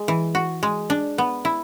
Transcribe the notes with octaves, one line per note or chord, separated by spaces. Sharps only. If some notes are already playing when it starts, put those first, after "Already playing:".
Already playing: G#3
E3
F#4
G#3
D4
B3
E4